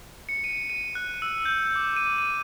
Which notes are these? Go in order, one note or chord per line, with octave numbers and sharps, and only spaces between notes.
C#7
D#7
D#7
F#6
E6
G6
D6
D#7
D#7